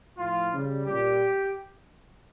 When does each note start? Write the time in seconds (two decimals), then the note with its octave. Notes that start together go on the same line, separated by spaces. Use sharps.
0.18 A2 F3 F4
0.53 C#3 G3
0.86 A#2 G3 G4